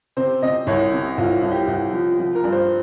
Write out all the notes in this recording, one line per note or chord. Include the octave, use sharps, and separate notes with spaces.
C3 C5
C3 D#5
C2 C#5
C3
C2 F4
C2
G4
C2
F3
F3
A#4
G2
C5